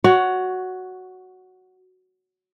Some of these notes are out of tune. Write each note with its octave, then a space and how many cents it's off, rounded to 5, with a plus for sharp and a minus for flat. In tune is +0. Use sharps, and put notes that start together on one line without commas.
F#4 +0 C#5 +20